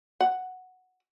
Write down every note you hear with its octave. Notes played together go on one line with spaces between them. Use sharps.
F#5